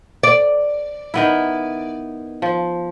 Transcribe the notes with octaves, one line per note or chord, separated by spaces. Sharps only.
D5
D#3 B3 E4
F3